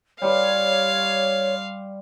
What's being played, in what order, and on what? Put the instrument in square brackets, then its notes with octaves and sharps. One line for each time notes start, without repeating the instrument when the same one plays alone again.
[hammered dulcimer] G3 C6 [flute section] C#5 [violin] F5